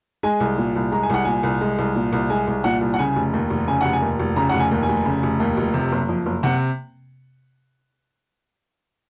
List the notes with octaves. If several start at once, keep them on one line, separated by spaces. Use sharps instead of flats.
G#3 G#5
C2
A#2
C2
G#3 A#5
G#5
C2 F#5
A#2 G#5
C2
G#3
C2
A#2
C2
G#3 G#5
C2
A#2 F#5
C2
F#5
C#3 G#5
F1
D#2
F1
C#3 G#5
F1 F#5
G#5
D#2
F1
C#3 A#5
F1 F#5
G#5
D#2
G#5
F1
C#3
F1
D#2
F1
C3
F#1
F2
F#1
C3 F#5